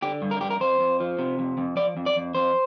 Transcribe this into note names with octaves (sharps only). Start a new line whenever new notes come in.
D3 G4
G2
A#4
G2 G4
A#4
F2 C5
F2
F3
C3
F2
F2
F3 D5
F2
D5
F2
F2 C5